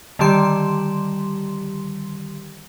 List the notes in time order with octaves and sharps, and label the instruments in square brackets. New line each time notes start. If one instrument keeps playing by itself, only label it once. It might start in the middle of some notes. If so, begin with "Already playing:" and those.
[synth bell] D3 D#3 G3 G4 C6 E7